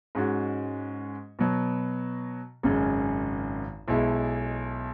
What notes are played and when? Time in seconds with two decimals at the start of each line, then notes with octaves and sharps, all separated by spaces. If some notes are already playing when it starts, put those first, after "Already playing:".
0.15 G#2 G#3 C#4 F#4
1.39 B2 F#3 B3
2.63 G#1 F#2 C#3 G#3
3.88 B1 B2 G#3 E4 G#4